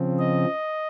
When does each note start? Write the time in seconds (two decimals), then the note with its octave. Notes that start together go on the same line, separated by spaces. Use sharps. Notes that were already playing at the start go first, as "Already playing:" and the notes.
Already playing: C#3 F3 C4
0.19 D#5